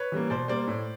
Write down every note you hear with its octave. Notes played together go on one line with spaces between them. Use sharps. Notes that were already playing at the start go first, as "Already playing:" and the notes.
Already playing: B4 C#5
E3 G3 A#3
B2 C5 D5
G3 A#3 C5 D5
A2